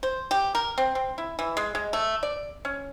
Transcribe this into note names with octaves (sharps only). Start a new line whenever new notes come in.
C5
G4
A#4
C4
C4
E4
E3
G#3
G#3
A3
D5
C#4